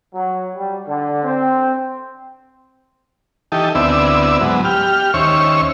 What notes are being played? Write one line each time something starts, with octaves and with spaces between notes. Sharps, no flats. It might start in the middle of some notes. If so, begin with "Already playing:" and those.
F#3
G3
D3
C4
E3 D#4 G4 A4
D2 B3 C4 E4 D5 E5
G#2 F#3 B3
G4 F6
D#2 C#4 C5 C#5 E5 C#6